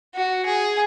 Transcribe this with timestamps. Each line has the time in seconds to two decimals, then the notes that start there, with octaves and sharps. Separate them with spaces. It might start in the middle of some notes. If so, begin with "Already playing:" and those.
0.15 F#4
0.46 G#4